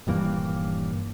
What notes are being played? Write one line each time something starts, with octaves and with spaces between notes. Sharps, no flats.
D#1 G2 E3 A#3